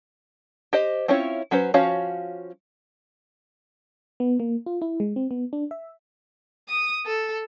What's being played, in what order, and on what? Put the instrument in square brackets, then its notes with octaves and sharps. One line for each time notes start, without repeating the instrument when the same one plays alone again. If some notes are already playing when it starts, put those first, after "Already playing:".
[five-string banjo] G4 C5 D#5
C4 C#4 E4 F4 C#5
F#3 C#4 B4 C5
F3 C#4 F#4 C#5 F5
[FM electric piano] B3
A#3
F4
E4
G#3
C4
B3
D4
E5
[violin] D#6
A4